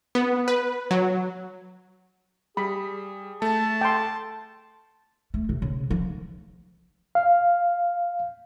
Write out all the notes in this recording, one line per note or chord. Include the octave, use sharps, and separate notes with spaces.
B3
B4
F#3
G3 G#4 B5
A3 A5
G5 C6
A3
C3
C#3
F3
F5